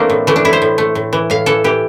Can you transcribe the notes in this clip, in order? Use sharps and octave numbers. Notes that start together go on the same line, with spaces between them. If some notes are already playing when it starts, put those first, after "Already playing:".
Already playing: E3 A3 A#3 C4 D4
A2
E3 A3
D4
A2 E4
C5
A2
A3
A2
E3
A2 F5
E3 A4
E3 G4